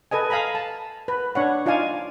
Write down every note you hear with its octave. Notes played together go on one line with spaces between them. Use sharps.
A4 B4 D#5 G#5
F5 G#5 A#5 B5
A5
B4
D4 C#5 F#5
D#4 F4 D5 F5 G#5